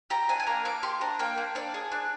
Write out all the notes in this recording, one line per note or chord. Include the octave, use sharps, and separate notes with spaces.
G4 A#5
D4 G#5
G#5
A#3 A#5
A#3 D6
G4 C6
D4 A#5
A#3 G5
A#3
D4 D5
G#4
D4